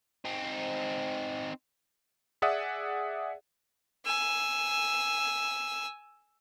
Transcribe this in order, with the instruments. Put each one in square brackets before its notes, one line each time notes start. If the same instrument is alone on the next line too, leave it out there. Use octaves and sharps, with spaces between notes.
[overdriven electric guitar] C4 D#4
[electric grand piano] G#4 D5 E5 F#5 D#6
[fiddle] G#5 E6